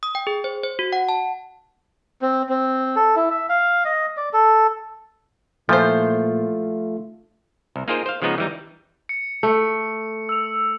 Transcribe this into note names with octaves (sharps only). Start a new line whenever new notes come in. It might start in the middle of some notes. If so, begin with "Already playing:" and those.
D#6
G5
G#4
C5
C5
F#4
F#5
A5
C4
C4
A4
E4
E5
F5
D#5
D5
A4
A#2 E3 F3 A3 F4 C5
C2
A#3 D#4 F4 G#4 A#4 C5
C5 F5
C#3 F3 G#3 B3 D#4
E3 G3 D#4
C#7
A3
E6 F7